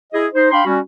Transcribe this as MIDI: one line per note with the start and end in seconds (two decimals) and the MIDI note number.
0.13 0.26 64
0.13 0.26 68
0.13 0.26 75
0.33 0.50 63
0.33 0.50 72
0.51 0.61 62
0.51 0.61 77
0.51 0.61 79
0.51 0.61 83
0.51 0.61 84
0.66 0.79 55
0.66 0.79 61
0.66 0.79 66